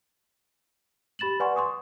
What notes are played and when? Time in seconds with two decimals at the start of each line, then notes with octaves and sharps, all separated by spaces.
1.19 G4 B5 A6 E7 F#7
1.40 B4 D5 F#5 G#5 C6 C#6
1.56 C6 C#6 D#6